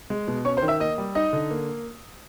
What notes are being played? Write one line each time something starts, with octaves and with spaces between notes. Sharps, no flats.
G#3
B2
C#4 C#5 C#6
C5 C6
D#3
E5 E6
A#3 D#5 D#6
G3
D#4 D#5 D#6
D3
A#3